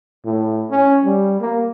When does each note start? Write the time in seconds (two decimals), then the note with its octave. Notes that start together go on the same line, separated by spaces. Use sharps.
0.25 A2
0.70 C#4
1.05 G3
1.41 A#3